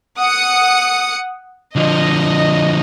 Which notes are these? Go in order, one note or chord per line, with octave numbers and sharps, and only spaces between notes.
F#5 D#6 C#7
D3 F3 D#5